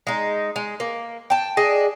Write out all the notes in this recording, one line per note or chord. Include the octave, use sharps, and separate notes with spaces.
G#3 D#4
G#3
A#3
G5 A5
D4 G#4 D#5